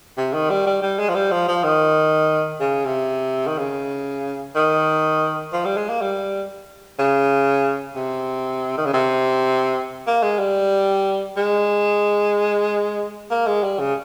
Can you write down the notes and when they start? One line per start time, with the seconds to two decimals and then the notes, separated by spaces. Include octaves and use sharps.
0.17 C3
0.33 D#3
0.50 G3
0.66 G3
0.82 G3
0.99 G#3
1.09 F3
1.15 G3
1.31 F3
1.48 F3
1.64 D#3
2.60 C#3
2.85 C3
3.47 D#3
3.59 C#3
4.55 D#3
5.53 F3
5.65 G3
5.77 G#3
5.89 A#3
6.01 G3
6.99 C#3
7.96 C3
8.77 D#3
8.86 C#3
8.93 C3
10.07 A#3
10.23 G#3
10.39 G3
11.37 G#3
13.31 A#3
13.47 G#3
13.63 G3
13.79 C#3